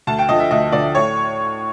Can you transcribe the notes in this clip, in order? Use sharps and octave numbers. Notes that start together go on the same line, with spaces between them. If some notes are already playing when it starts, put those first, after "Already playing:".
D2 A5
G5
D3 F3 D#5
E5
D2 D#5
D3 F3 D5
A2 C#5